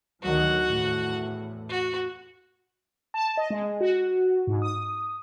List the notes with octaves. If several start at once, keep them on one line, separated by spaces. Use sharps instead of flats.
D2 D#3 F#3 F#4 F#5
E2 A2
F#4
A5
D#5
G#3
F#4
G#2
D#6